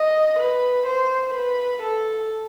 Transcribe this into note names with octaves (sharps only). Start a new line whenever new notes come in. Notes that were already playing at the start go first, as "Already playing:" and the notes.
Already playing: D#5
B4
C5
B4
A4